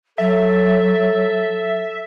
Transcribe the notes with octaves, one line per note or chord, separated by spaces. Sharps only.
F#3 A4 E5